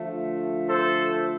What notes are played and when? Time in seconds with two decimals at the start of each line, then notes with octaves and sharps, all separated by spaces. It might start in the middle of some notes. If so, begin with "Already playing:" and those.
Already playing: D3 F3 A3
0.68 A4 C5